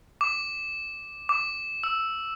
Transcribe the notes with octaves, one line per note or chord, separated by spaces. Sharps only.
D6
D6
E6